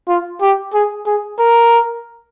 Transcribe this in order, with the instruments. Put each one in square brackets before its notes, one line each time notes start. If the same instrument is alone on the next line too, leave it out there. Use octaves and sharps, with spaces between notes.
[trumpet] F4
G4
G#4
G#4
A#4